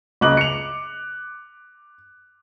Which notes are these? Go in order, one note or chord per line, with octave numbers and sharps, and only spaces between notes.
C#2 C#3 D#5 D6 F#6 F#7
C#7 F7